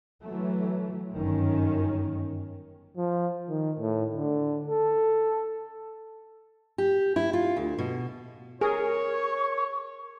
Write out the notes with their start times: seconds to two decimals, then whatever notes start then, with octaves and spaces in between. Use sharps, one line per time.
0.23 E3 F#3 A3
1.12 G1 F#2 D#3 C#4
2.97 F3
3.49 D#3
3.79 A2
4.15 D3
4.67 A4
6.78 G4
7.16 E4
7.33 F4
7.57 D2
7.78 B2
8.61 G#4 A#4 C#5 C#6